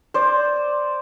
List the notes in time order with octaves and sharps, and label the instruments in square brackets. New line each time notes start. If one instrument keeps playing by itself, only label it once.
[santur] C5 D5